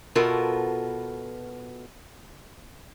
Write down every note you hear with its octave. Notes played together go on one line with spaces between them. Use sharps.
B2 B3 F4 F#4 A4 A#4